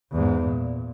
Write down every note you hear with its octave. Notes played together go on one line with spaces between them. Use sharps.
E2 G#2
A#2